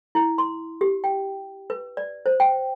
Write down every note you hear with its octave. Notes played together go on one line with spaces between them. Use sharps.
E4
C6
G4
G5
B4
D5
C5
G5